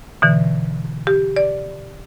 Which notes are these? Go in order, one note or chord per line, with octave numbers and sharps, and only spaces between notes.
B2 D3 E3
G4
D5